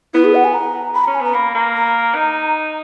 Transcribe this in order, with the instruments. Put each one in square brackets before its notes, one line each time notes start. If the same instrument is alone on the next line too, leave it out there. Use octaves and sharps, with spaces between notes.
[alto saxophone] B3 [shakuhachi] E4
[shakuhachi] G#4
F#5
G#5
A#5
B5
A#5
[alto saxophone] C#4
[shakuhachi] G#5
[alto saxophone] B3 [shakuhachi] A#5
[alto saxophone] A#3 [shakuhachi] B5
[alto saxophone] A#3 [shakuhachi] A#5
[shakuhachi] A#5
[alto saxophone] D#4